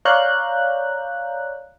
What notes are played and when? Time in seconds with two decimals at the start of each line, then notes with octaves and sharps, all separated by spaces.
0.05 C#5 D5 F5 A#5 F#6 G6